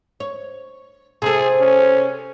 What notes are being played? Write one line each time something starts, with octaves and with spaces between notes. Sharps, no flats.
C#5
C3 G#4 A4
C#4